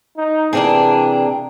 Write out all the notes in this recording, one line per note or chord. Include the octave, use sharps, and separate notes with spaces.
D#4
C3 E3 A#3 D4 G#4 G5 A#5